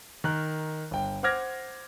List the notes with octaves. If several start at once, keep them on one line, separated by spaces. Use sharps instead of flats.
D#3 A#4 F#6
G1 G5
C5 F#5 D6 F6 G#6 A#6